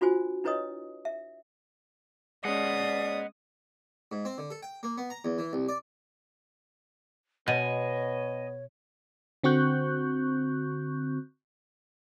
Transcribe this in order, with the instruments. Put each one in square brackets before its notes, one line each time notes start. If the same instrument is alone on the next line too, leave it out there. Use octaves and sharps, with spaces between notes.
[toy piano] D4 F4 F#4 C5 G#5
D4 E4 B4 C#5 D#5 D#6
E5
[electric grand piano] G#3 C#4 [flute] D5 [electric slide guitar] D#5 F#5 [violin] D#6
[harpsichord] G#2
C4
D3
A4
G5
A#3
B3
A#5
E2
E3
C2
D5
[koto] B2 [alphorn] B3 [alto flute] C#5 [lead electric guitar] D#5 G#5
[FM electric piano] D3 C4 F#4 C#6 F#6 G6